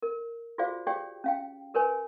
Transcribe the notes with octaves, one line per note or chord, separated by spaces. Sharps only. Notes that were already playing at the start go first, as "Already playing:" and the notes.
A#4
F4 F#4 G#4 C5 D5 F5
G4 G#4 C#5 D5 F5 G5
C#4 F5 G5
G4 A#4 B4 C#5 G#5